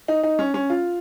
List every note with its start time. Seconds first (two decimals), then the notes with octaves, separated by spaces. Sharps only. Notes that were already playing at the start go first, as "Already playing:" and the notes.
0.08 D#4
0.23 D#4
0.39 C#4
0.54 C#4
0.70 F4